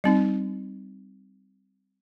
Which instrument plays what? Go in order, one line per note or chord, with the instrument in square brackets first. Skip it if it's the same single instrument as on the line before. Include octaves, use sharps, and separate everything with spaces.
[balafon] G3 C4 D#4